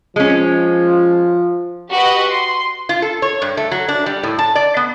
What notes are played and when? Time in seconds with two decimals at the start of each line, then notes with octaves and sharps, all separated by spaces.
0.16 F3 G#3 C#4
1.91 F#4 G4 B4 D#5
2.28 C6
2.89 F4
3.02 A4
3.22 C#5
3.42 G2
3.57 A3
3.72 F#3
3.88 D4
4.06 G3
4.23 A2
4.39 A5
4.55 D5
4.77 B3